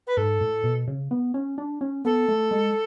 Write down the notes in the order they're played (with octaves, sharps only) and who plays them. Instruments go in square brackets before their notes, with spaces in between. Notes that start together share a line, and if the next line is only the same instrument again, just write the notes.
[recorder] B4
[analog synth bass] G#2 [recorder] A4
[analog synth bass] A2
B2
C#3
B3
C#4
D4
C#4
[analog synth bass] B3 [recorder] A4
[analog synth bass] A3
G#3